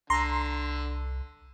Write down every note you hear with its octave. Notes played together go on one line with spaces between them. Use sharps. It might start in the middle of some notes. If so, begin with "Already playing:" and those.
C2 D3 A#5 C6